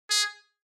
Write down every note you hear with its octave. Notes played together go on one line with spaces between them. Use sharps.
G#4